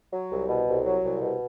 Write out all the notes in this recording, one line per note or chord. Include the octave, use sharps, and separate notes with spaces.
F#3
C2
B2
C2
F#3
C2
B2